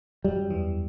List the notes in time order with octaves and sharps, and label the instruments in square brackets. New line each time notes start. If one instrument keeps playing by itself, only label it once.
[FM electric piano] F#2 F#3 [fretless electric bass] G3
[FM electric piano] E2 E3